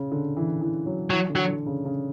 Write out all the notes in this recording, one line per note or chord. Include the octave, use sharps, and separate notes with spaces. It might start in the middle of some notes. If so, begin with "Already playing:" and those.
Already playing: C#3
D3
E3
E3
F#3
E3 F#3
D3
F#3
D3
C#3
C#3